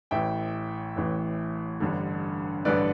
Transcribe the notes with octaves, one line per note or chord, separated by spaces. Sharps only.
A1 A2 E3 E5 G5
A1 A2 E3
A1 G2 D3
A1 G2 D3 B4 D5